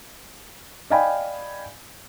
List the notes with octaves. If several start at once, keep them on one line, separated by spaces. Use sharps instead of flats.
D5 D#5 F5 G5 G#5 B5